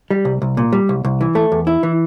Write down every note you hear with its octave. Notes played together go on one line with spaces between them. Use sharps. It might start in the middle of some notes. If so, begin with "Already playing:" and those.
G3
C2
C2
A#2
G3
C2
C2
E3
A3
E2
E4
E3